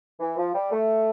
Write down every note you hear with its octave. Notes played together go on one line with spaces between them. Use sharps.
E3
F3
G3
A3